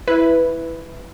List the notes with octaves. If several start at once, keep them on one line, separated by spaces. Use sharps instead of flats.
E4 B4